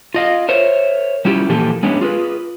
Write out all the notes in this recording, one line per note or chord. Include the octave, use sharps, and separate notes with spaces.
F4 D#5 F5
A#4 C5 C#5 E5
G3 C#4 E4 F4 G4
A#2 E3 F3 A#3 G4 A4
G#3 A3 B3 C#4 D4 G4
F4 G#4 B4